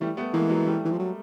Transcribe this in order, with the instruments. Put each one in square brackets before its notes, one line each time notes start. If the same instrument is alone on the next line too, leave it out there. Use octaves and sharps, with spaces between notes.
[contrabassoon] E3 [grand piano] G3 A3
[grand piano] A3 B3
[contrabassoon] E3 [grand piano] G#3 A#3
[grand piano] F#3 G#3
G3 A3
[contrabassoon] E3
F3
F#3